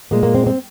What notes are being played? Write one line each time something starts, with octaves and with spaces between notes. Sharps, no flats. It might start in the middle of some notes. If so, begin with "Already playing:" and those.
A#2 G#3 A#3
A#3
C4
C4